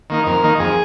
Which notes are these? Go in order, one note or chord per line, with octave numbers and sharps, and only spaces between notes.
D#3 A#3 D#4
F2 A#4
D#3 A#3 D#4
F2 G#4